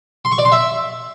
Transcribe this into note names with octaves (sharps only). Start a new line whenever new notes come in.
C6
C#6
D5
C6
E5